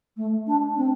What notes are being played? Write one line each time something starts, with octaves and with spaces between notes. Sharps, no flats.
A3
D4
C4